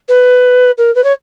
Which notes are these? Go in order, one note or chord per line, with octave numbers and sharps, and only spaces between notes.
B4
A#4
B4
C#5